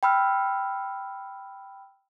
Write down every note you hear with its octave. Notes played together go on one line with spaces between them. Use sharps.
G5 B5 E6 F6